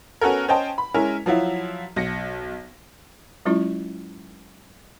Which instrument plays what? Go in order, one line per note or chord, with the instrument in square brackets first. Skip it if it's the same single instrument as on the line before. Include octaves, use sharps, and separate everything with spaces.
[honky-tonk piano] B3 C#4 F#4 A4 A#4
C#4 C5 D#5 G5 A5
B5
G#3 C#4 E4 A#4
F3 F#3 E4 F4
B1 A#6 C#7
[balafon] F#3 G#3 C#4 E4 F4